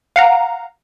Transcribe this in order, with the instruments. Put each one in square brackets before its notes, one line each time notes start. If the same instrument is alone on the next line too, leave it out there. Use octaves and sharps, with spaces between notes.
[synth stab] F5 F#5 A#5